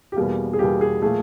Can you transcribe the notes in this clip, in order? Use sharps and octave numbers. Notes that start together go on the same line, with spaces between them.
G4
E2 B2 G3 A#3 G#4
G#4
E2 B2 G3 A#3 G4
G#4
A#2 F3 A3 G#4